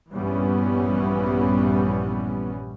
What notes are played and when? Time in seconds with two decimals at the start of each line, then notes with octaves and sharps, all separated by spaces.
0.12 A#1 G2 E3 G3 B3 C#4